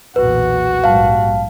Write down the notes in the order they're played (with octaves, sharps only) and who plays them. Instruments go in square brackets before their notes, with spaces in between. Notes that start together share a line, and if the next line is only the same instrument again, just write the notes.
[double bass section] B1 E2 A#2 [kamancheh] F#4 [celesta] B4
[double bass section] A#1 G#2 G3 [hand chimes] F5 A5